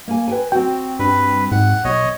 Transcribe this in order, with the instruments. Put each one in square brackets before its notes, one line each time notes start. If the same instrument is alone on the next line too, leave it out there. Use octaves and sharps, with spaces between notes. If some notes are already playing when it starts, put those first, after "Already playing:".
[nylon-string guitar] A#3 G#5
B4 G5 G#5
[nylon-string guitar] C4 F#4 [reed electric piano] G5
[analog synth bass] G2 [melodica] B4
[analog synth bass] G#2 [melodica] F#5
[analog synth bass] B1 [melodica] C#5 D#5